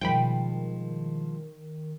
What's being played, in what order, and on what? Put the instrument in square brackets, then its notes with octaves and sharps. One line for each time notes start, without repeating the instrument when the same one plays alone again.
[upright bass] B2 G3 [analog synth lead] D#3 [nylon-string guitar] F3 G#3 D#4 [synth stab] G5 B5